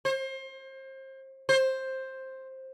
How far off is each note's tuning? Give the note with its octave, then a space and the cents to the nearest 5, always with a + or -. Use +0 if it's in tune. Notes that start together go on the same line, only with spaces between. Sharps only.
C5 +30
C5 +10